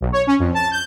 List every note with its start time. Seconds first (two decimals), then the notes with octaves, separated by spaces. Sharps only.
0.01 B1
0.12 C#5
0.27 C#4
0.39 F2
0.54 A5
0.71 G6